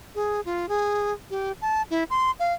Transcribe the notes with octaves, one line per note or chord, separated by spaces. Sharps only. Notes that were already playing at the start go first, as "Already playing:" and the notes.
G#4
F4
G#4
G4
A5
E4
C6
F5